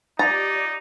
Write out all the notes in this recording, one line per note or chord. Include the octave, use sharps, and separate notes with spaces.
D#4 F4 G4 D5 A#5 A6